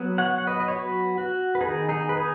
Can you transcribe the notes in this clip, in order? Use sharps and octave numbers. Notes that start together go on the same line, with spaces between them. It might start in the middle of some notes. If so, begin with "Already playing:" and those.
Already playing: F#3 B3
C#5 F#5
F#5
B4 D#5
D#5
C#5
F#4 B4
F#4
B4
D#3 B3 D#4 G#4
D#4 G#4
B4
D#4 G#4